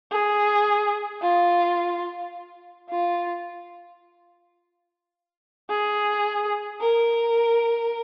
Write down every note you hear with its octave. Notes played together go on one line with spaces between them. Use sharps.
G#4
F4
F4
G#4
A#4